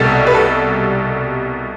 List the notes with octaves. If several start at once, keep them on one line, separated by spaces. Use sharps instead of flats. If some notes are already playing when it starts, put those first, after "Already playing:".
Already playing: C2 B2 G3 A4
B4
A4